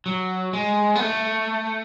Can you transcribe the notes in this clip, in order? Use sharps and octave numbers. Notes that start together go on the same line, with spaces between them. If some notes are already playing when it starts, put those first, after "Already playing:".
F#3
G#3
B3
A3